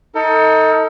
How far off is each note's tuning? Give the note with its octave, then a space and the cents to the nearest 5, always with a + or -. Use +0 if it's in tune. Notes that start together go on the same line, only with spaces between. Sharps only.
D#4 +25 A4 +35